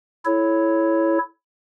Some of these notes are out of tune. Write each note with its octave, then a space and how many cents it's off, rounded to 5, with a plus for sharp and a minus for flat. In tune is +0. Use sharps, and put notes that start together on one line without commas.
E4 +0 A4 -20 C#5 +0